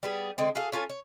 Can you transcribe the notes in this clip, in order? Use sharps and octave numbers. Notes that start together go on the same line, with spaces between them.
G3 B3 G#4
D3 G#3 C4
F#4 G#4 A4 F5
C#4 F4 A4 G#5
C#5